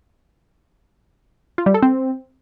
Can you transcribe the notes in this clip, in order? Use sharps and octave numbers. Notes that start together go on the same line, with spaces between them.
F4
G3
A4
C4